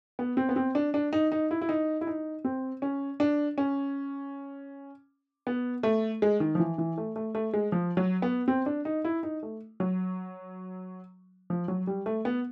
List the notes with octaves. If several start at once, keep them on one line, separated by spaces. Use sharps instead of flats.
B3
C4
B3
C4
D4
D4
D#4
D#4
E4
E4
D#4
E4
D#4
C4
C#4
D4
C#4
B3
A3
G#3
D#3
F3
E3
E3
A3
A3
A3
G#3
F3
F#3
B3
C4
D4
D#4
E4
D#4
A3
F#3
F3
F#3
G3
A3
B3